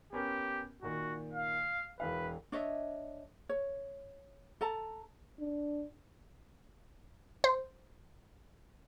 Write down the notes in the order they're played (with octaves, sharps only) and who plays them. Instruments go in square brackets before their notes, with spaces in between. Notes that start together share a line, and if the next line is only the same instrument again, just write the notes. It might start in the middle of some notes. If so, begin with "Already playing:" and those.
[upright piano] B3 C#4 A#4 [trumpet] G4
[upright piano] A#2 D#3 [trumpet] F#4
[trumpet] F5
[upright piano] E1 E3 F5 [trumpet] B4
[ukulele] D4 C#5 D#5 E5
C#5
A4 A5 A#5
[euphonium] D4
[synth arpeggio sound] C5